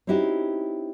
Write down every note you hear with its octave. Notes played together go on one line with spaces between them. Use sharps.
C4 C#4 D#4 E4 F#4 G4